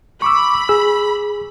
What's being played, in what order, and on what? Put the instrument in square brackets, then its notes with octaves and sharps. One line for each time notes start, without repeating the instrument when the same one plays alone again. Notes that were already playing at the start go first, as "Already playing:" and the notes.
[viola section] B5 [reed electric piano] C#6 D6 E6
[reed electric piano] G#4 E6